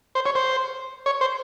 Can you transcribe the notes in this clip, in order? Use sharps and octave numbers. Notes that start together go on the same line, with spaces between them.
C5
C#5
C5
C#5
C5